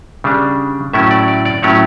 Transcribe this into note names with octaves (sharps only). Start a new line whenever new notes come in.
C#3 G3 D4
A2 F#3 A3 C#4 E4 E5
D5
D5
D5
A2 F#3 A3 C#4 E4 C#5